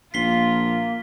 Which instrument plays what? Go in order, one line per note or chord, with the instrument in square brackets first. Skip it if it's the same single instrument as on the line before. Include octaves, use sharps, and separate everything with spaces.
[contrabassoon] A#1 [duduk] A#3 [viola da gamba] F4 [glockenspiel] B6 C7 G7